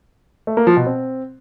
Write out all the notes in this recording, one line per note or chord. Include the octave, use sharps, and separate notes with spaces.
A3
A#3
F3
B2
C4